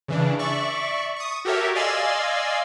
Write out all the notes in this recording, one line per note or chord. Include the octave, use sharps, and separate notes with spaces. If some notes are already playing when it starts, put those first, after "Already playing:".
C#3 E3 D4
D5 E5 C#6
C#6 D#6
F#4 G4 A4 A#4 C#5 E5
D5 D#5 F5 G#5 C6 E6